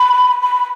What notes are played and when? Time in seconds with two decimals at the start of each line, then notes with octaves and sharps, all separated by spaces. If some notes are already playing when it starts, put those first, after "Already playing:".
Already playing: B5
0.42 B5